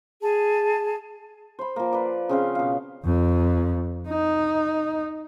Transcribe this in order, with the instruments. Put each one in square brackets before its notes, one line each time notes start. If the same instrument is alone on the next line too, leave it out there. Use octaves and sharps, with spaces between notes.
[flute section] G#4 A5
[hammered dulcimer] C5 B5
F3 A#3
B4 D5
C#3 C4 F5
B2 F5
[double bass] F2
D#4